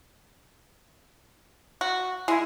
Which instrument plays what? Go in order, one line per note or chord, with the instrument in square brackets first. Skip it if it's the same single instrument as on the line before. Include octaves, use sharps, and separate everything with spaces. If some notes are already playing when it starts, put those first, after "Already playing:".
[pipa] F#4
[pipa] G#3 [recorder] E4